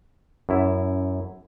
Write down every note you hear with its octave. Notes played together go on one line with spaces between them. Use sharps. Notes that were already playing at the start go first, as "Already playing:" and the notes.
F#2 E4